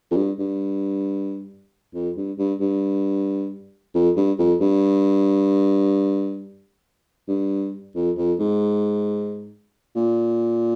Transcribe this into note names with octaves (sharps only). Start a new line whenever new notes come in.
F2
G2
G2
F2
G2
G2
G2
F2
G2
F2
G2
G2
F2
F2
G#2
A#2